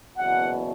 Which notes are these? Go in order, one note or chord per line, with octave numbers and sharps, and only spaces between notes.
F#1 E2 B2 F#5